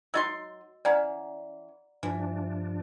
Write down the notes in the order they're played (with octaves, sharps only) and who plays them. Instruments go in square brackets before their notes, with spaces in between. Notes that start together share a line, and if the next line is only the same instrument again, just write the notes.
[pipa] F#3 D#4 C6 [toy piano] F#4 D#5 E6
[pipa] E3 C#4 [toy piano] D5 F#5 A#5
[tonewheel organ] G2 F3 D4 [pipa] E3